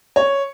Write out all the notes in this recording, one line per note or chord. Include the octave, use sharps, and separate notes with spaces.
C#5